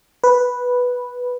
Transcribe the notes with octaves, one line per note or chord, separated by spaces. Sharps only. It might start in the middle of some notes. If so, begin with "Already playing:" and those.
B4